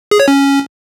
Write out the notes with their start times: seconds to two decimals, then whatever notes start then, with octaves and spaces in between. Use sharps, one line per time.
0.11 G#4
0.20 C#5
0.28 C#4